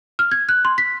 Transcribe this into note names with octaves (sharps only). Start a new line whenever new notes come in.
F6
G#6
F#6
C6
B6